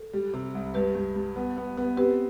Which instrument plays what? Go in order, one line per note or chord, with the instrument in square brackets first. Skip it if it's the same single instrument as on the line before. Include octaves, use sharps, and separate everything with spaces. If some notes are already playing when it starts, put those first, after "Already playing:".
Already playing: [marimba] A4
[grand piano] G3
C3
C2
[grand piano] G2 [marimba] G4 B4
[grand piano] G2
G2
B3
B3
B3
[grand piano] C4 [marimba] G4 B4